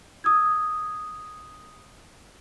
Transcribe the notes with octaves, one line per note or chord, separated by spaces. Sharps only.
D#6 E6 G#6